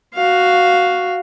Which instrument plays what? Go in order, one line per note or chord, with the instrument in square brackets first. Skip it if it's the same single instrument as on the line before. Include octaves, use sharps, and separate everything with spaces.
[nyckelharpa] F#4 F5